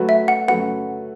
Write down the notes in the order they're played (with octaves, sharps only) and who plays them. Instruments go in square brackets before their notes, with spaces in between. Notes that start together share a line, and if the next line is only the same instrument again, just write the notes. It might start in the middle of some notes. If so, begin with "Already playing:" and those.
Already playing: [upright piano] F#3 A3 F#4 B4
[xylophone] E5
F#5
[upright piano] F#3 A3 F#4 B4 [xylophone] F#5